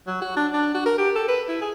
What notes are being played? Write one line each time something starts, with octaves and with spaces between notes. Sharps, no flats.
F#3
F#4
D4
D4
F#4
A#4
G4
A4
B4
E4
G#4